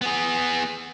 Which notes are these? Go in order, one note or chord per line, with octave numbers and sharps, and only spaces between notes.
B3 G#4